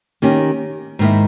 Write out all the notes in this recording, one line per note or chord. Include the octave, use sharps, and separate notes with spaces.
D#3 A#3 C#4 G4
G#2 D#3 A#3 E4